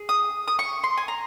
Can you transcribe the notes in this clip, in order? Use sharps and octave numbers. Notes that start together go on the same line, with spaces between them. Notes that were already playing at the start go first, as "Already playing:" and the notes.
Already playing: G#4
D#6
D#6
C#6
C6
G#5
A#5